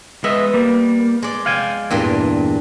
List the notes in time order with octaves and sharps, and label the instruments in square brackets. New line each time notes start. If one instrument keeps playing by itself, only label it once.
[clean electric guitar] G#3 D#5 E5 [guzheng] B3
[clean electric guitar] G3 A#3
[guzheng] G#3 D5
[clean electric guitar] F5 G5 G#5
[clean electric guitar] E2 [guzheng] G2 A#2 G5